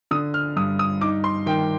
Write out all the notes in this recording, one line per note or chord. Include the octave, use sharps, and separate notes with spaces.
D3 D#6
F6
G2 D#6
D#6
D#4 D6
C6
D#3 G5